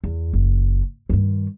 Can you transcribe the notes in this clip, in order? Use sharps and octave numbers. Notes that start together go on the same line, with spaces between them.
E2
F#1
G2 D#3